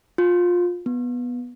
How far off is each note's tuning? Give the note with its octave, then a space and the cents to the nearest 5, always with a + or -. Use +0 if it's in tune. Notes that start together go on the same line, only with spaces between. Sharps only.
F4 +20
B3 -10